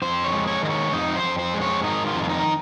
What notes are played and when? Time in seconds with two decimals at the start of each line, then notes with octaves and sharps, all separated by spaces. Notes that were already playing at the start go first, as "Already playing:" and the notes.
0.02 F2 C5
0.24 C#5
0.32 G#3
0.47 C#5
0.62 D#3 D#5
0.70 C#5
0.93 F2 D#4
1.16 C5
1.23 F2
1.39 C5
1.54 G#3
1.61 C#5
1.84 D#3 D#4
2.07 F4
2.15 F2
2.24 F4
2.29 D#4